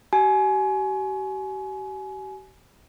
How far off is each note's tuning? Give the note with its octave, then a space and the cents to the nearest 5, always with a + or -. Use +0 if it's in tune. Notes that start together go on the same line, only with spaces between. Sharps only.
G4 -40 G#5 +25